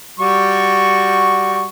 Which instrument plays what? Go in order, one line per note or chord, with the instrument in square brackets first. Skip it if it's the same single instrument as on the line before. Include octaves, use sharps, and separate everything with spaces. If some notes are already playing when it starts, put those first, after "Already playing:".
[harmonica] G3 F#4 C#6